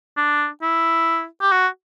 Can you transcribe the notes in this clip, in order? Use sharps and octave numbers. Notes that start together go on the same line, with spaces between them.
D4
E4
G4
F#4